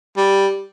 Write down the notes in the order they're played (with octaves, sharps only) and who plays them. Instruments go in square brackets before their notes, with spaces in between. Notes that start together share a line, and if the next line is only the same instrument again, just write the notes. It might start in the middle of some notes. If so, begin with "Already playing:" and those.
[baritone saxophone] G3